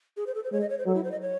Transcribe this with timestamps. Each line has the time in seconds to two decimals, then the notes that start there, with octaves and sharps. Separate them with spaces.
0.17 G#4
0.27 C5
0.35 A4
0.44 C5
0.52 G#3 C#5
0.61 D#5
0.70 C#5
0.78 C5
0.86 F#3 A4
0.95 E4
1.04 C5
1.12 D#5
1.21 C#5